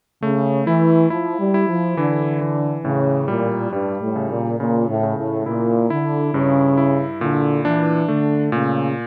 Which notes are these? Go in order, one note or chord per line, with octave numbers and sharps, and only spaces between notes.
C#3 A3
E3 E4
F3 E4
G3
E4
F3
D3 E3
E3
A2 C#3
A#2 G3
G2 G3
A2
C#3
A#2
A#2 C#3
A2
C#3
A2
A#2 E4
D3 E4
G2 C#3
E4
A#2 D3
E3 D4
D3 A3
A#2 C#3